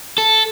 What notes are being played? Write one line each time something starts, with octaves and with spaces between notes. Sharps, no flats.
A4